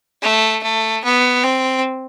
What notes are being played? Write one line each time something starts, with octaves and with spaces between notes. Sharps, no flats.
A3
A3
B3
C4